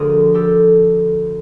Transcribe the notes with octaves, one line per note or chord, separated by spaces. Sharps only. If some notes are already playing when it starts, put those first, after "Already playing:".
Already playing: D2 D3 F3 G#4 A#4
G4 A4